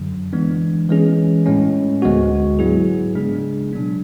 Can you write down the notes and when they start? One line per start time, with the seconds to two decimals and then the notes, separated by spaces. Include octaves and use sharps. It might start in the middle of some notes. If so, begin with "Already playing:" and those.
Already playing: F#2 D3 F#3
0.33 E3 G#3 B3 D4
0.89 E3 G#3 C#4 G#4
1.46 A2 G#3 C#4
2.02 D2 D3 G#3 B3 F#4
2.59 G#2 F#3 B3 E4 G#4
3.15 C#3 G#3 D4 G#4
3.73 B2 F#3 B3 D4